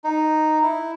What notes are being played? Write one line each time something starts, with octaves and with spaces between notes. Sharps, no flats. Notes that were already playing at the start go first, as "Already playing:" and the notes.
D#4
E4